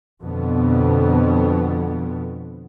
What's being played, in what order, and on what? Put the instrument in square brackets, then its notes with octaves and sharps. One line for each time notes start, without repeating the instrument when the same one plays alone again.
[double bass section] F2 B2 D3 B3